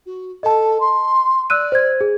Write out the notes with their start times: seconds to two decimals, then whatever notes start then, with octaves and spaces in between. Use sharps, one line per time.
0.06 F#4
0.43 A4 D#5 A5
0.80 C6
1.50 D5 E6 F#6 D#7
1.72 C5 G#6
2.01 G#4